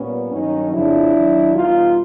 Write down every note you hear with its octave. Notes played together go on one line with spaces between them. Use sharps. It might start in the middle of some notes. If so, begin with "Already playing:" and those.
Already playing: A#2 G3 B3 C#4
G2 D#3 F#3 C#4 D#4
F2 C#3 F3 D4 E4
D#2 D#3 F#3
E2 B2 G3 D#4 F4